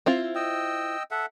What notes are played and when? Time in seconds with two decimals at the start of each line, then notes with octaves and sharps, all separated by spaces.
0.06 C4 E4 F4
0.35 D#5 G5 E6
1.11 A4 E5 F#5